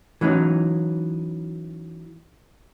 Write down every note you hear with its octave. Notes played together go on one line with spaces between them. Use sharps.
E3 F#3 C#4 D#4